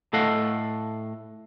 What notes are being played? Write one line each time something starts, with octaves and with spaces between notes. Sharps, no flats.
A2 A3 A4 D#5 F5 F#5